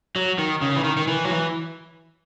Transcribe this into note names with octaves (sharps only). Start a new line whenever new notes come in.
F#3
D#3
C#3
E3
D#3
D#3
E3
F#3
E3